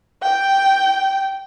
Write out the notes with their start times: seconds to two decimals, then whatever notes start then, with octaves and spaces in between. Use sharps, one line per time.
0.22 G5